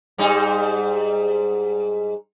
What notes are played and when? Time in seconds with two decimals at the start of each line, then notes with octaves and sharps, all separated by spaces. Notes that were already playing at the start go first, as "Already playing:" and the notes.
0.18 G#2 G3 D#4